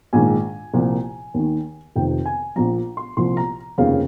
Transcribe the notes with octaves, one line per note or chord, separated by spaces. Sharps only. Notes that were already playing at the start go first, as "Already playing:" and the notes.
A#1 G#2 D#3 G#5
C2 A#2 F3
D#2 D#3
F1 F2 C3 D#3 G5
G#5
A#1 A#2 F3 A#5
C6
C2 A#2 F3 C6
A#5
F1 D#2 C#3 F3 F5